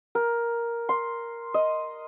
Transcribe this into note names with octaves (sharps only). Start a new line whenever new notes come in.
A#4
C6
D#5